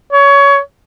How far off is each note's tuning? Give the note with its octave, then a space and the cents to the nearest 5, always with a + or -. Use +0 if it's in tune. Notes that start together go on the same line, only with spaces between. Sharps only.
C#5 +20